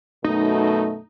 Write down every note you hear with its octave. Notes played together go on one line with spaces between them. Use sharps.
F#2 B2 A3 D#4